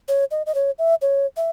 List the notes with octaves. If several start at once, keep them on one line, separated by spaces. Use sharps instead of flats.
C#5
D#5
D#5
C#5
E5
C#5
E5